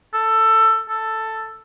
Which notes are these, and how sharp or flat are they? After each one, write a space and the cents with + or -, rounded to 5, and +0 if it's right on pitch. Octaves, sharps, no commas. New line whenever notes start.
A4 +15
A4 +5